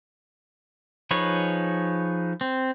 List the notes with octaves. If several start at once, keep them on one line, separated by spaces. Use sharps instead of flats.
F3 D#4 G#4 B4 C#5
C4